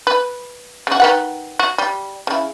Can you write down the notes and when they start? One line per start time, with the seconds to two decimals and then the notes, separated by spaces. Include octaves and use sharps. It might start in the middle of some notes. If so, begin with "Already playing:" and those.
0.07 B4
0.87 C#3 F#4
1.00 D#3 B4 F#5
1.59 F#4
1.78 G3
2.27 C#3 E4